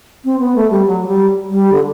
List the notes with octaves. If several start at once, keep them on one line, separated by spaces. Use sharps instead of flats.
C4
B3
A3
G3
F#3
G3
G3
D3